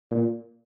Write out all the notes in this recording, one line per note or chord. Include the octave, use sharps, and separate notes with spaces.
A#2